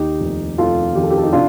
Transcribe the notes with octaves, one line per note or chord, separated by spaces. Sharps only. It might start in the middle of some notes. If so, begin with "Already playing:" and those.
Already playing: D#2 D#4 G4
F1
F1 F4 A4
D#3 G4
A4
G4
A4
D#4 G4
C3 D4 F4